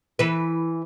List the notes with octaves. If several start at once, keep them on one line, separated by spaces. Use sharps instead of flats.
E3 B4